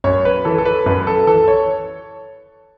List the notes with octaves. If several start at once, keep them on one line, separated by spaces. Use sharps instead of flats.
F#2 C#5
B4
E3 A4
A4
B4
F#2 B4
A4
E3 A4
C#5